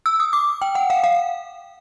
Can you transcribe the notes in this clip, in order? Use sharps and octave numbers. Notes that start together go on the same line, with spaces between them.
E6
D#6
D6
G5
F#5
F5
F5